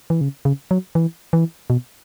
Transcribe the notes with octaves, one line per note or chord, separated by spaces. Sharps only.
E3
C#3
C#3
F#3
E3
E3
B2